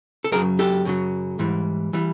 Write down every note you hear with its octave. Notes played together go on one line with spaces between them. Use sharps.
A4
F#2 C#3 F#3 G#4 A#4
G4 A4
F#2 C#3 F#3
G#2 E3 G3
E3 G3